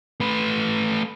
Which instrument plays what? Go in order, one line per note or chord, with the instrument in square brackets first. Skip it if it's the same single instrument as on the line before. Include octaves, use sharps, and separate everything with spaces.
[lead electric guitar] A3 B4